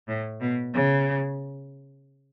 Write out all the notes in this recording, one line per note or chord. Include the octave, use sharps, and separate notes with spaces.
A2
B2
C#3